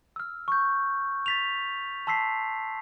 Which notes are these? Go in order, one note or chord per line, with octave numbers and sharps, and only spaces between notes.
E6 F6
C#6 G6
A6 B6 F7
A5 C6 E6 B6 C7